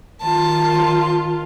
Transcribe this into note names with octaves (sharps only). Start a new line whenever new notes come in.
D#3 F4 A5